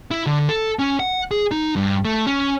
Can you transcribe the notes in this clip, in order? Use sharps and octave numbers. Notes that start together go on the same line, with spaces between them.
E4
D3
A4
C#4
F#5
G#4
D#4
G2
A3
C#4